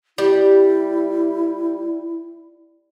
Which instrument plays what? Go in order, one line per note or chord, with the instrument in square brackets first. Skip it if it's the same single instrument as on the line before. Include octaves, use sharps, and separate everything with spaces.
[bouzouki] G3 [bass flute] E4